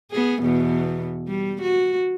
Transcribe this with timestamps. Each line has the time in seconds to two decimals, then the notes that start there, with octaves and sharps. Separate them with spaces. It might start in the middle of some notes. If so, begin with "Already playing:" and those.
0.11 B3 G#4
0.42 E2 B2
1.28 G3
1.62 F#4